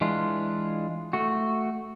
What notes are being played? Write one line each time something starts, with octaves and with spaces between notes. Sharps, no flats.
E3 G#3 D4 F4
A3 F#4